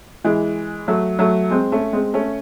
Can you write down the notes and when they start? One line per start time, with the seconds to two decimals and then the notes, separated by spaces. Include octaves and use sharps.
0.24 E3 G#3
0.88 F#3 A3
1.19 F#3 A3
1.51 G#3 C4
1.72 A3 C#4
1.93 G#3 C4
2.14 A3 C#4